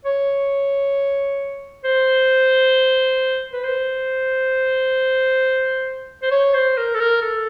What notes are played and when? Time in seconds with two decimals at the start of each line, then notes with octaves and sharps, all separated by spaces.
0.05 C#5
1.84 C5
3.53 B4
3.63 C5
6.22 C5
6.31 C#5
6.54 C5
6.77 A#4
6.94 A4
6.99 A#4
7.22 A4